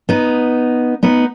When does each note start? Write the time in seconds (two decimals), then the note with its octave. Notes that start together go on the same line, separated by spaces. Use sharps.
0.09 B3 D#4
1.03 B3 D#4